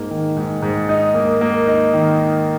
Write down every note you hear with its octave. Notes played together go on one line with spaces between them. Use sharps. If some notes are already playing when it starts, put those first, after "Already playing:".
Already playing: G#2 A#3
D#3
G#2
G#2
D#4
A#3
A#3
D#4
D#3
D#4